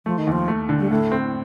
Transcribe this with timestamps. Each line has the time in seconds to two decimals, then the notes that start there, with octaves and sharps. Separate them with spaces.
0.06 F3 A3
0.18 D#3
0.27 D#2 F3
0.48 A3
0.69 D3
0.79 G3
0.91 A2 A3
1.12 C4